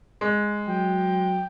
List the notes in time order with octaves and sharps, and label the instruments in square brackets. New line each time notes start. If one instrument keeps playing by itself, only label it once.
[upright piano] G#3
[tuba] F#3 [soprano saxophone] G5